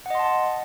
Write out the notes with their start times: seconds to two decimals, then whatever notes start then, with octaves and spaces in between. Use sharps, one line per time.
0.06 F#5
0.10 D#5
0.15 C6
0.19 A5